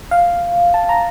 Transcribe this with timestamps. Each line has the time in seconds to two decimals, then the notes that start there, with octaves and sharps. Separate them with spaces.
0.11 F5
0.74 A5
0.89 A#5